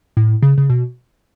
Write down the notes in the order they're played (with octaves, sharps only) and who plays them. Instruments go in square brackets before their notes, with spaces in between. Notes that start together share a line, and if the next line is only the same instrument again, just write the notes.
[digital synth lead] A2
C#3
C#3
B2